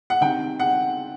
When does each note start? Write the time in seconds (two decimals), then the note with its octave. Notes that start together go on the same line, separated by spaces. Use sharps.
0.10 F#5
0.21 C3 D#3 G5
0.60 F#5